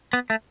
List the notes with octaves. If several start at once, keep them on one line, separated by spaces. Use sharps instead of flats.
B3
A3